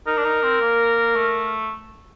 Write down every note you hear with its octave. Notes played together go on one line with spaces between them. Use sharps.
D#4 A#4
D4
D#4
C4
A#3
A3